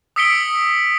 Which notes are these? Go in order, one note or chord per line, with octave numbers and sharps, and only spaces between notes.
D#6 E6 B6 C#7 D7 G7